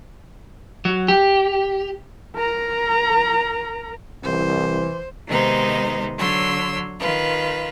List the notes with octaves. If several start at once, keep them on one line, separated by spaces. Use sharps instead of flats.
F#3
G4
A#4 A#5
C2 E3 C5
C3 D#3 G#3 B3 D#4 C5
D3 F#3 C#5 C6 E6
D#3 F4 B4